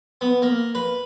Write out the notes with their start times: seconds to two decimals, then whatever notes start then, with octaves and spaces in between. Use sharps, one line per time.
0.21 B3
0.42 A#3
0.75 B4